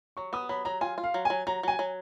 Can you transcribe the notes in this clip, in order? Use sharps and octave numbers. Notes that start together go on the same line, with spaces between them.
F#3 C#6
B3 D#6
F#3 B5
F#3 A#5
F4 G#5
F4
F5
F#3
F#3 G#5
F#3 A#5
F#3 G#5
F#3